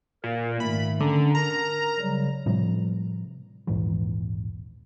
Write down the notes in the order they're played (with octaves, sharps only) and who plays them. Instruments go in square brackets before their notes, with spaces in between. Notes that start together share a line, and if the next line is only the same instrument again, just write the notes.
[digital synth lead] A#2 [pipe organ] A#4
[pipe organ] G#2 D#3 A3 [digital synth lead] B5
[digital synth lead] D3 [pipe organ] C#4 A#5
[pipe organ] A#4 [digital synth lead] A#5
[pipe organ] C#3 F#3 G3
[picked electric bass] A2 C3 F3 G3
A#1 D#2 G#2 E3